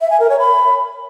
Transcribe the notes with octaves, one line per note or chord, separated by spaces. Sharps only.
E5
G#5
A#4
C#5
B5